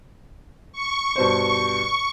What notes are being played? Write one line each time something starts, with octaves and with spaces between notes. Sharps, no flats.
C#6
G2 B2 C5